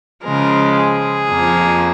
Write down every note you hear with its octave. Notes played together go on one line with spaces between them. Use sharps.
C#3 F3 G#3 A#4
G#4
F2 F3 A#3